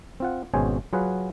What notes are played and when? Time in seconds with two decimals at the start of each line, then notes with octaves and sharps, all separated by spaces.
0.20 C4 F4 F#5
0.54 G#1 B2 C#4 G#4 C5 G#5
0.93 F#3 F4 G#4 B4 F#5